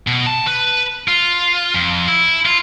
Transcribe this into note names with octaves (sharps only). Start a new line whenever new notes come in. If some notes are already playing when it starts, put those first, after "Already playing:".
B2
A5
B4
F4
F2
E4
F4